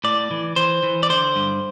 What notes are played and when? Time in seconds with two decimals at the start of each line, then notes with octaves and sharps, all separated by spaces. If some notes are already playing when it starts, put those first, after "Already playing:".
0.04 A2 D5
0.31 E3
0.56 E3 C5
0.83 E3
1.03 D5
1.09 D3 C5
1.36 G2